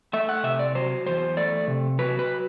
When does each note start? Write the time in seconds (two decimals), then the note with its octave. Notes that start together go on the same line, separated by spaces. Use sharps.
0.13 A3 E5
0.29 F#5
0.44 C3 E5
0.59 D5
0.75 F#3 C5
1.06 E2 C5
1.37 A3 D5
1.68 C3
1.99 F#3 B4
2.19 B4